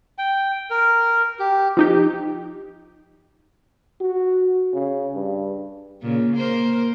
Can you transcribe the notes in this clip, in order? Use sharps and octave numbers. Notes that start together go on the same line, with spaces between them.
G5
A#4
G4
F3 D#4 G4
F#4
C#3
G2
A#2 C#3
A#3 A#4 C5